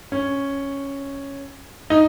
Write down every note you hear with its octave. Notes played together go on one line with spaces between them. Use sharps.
C#4
D#4